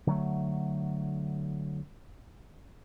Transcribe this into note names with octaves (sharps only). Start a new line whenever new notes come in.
D3 F#3 A3